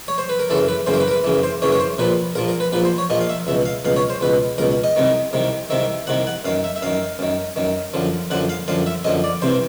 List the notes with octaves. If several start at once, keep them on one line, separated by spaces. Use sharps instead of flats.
C#5
C5
B4
A#4
F#2 C#3 E3 A4
B4
F#2 C#3 E3 C5
A#4
B4
A#4
B4
F#2 C#3 E3
C5
F#2 C#3 E3 C#5
C#5
C5
A#1 A#2 F3 B4
A#1 A#2 F3 A#4
A#4
B4
A#1 A#2 F3 B4
C5
C#5
A#1 A#2 F3 D#5
F5
E5
C#2 B2 E5
F5
C#2 B2 F5
C#5
C5
C#2 B2 B4
C#2 B2 A#4
D#5
C2 C3 D#3
C2 C3 D#3
C2 C3 D#3 E5
C2 C3 D#3 F#5
F#5
F#2 D#3 F5
E5
E5
F#2 D#3 F5
F#2 D#3
F#2 D#3
F#2 D3 F3
F#2 D3 F3 F#5
F5
F#2 D3 F3 F5
E5
F#2 D3 F3 D#5
D5
C2 C3 E3 C5